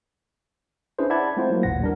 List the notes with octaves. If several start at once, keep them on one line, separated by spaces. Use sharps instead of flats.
C#4 D4 E4 G#4 B4 C5
D5 E5 F#5 A5 B5 G#6
G#3 A3 C4 E4 F4 C5
F#3 A#3
A1 D#2 A#2 E3 F#5 A#6
G3 D4 A#4